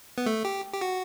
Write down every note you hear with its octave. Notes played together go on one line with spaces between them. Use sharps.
B3
A3
G4
G4
F#4